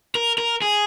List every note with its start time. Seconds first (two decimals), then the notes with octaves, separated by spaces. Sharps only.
0.15 A#4
0.38 A#4
0.62 G#4